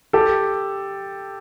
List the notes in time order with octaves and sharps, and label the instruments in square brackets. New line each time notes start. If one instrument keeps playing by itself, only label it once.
[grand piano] G4 A4